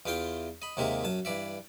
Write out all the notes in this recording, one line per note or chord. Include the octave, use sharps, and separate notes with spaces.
E2 E3 F4 G5 C6
D#5 B5
D#2 C3 G#3 A#3 C4 E5
F#2 A5
G2 E3 D5 E5